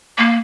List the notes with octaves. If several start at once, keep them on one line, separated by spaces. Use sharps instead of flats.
A#3